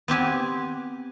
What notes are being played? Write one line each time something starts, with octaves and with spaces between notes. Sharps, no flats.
B3 C4 G4 G#5